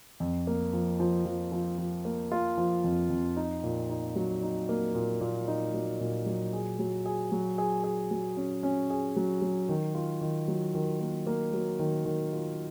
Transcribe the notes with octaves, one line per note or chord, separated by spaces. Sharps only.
F2
A#3
F3
F3
F3
F3
F3
A#3
F4
F3
F2
F2
D#4
A#2
D#4
F#3
D#4
A#3
A#2
A#2
D#4
F#3
A#2
F#3
G#4
F#3
G#4
F#3
G#4
G#4
F#3
C#4
C#4
G#4
F#3
F#3
D#3
F4
D#3
F#3
D#3
A#3
A#3
F#3
D#3
D#3
F4